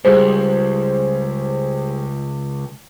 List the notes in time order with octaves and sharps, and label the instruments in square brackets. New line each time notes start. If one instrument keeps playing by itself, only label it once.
[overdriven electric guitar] C#2 [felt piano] G3 G#4 C5